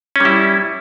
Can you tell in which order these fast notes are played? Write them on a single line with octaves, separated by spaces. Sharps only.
C#4 G3 E4